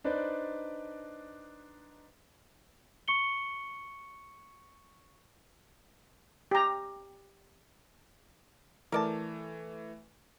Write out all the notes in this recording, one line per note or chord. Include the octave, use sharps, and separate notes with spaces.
D4 D#4 B4 C5 D5
C#6 C#7 G7
G4 A#5
E3 A3 A#4 D5 A5